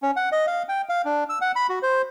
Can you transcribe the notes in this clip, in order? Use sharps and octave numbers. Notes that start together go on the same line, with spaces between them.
C#4
F#5
D#5
F5
G5
F5
D4
E6
F#5
B5
F#4
C5